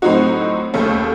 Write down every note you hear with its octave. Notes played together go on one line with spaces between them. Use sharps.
A2 F#3 C4 D#4 F#4
D#2 C#3 A3 C#4 A4